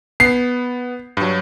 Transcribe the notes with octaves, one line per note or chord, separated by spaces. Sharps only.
B3 C7
G2 F#3